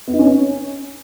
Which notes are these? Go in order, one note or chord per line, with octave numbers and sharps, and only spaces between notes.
B3
D#4
C#4